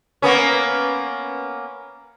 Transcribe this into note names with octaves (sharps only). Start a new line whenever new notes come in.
A#3 B3 C#4